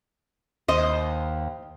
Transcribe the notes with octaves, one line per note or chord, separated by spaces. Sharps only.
D#2 C5 D#5